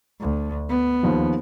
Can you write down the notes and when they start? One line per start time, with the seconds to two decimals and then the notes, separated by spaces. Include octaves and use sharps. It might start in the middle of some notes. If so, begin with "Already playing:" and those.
0.20 D2
0.69 B3
1.03 D#2 F3